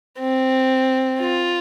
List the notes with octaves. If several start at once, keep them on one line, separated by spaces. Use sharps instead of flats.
C4
F4